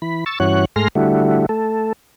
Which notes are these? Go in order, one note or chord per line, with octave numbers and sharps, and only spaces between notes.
E3 B5
C#6 E6 A6
G2 E3 C#4 F#4 C#5 F#6
G#2 A3 G#4 C6 F6 A#6
D3 G3 A3 E4 F#4
A3 A4